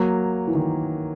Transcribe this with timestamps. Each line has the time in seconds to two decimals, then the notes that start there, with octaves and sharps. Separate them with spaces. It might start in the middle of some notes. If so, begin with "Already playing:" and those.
Already playing: F#3 A#3
0.47 E3
0.55 D#3